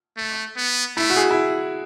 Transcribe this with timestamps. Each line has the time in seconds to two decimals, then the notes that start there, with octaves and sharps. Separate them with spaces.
0.17 A3
0.57 B3
0.97 A3 E4
1.10 F#4
1.16 G#4
1.31 E4